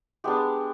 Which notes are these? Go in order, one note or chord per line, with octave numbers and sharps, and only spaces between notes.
G#3 B3 D4 G4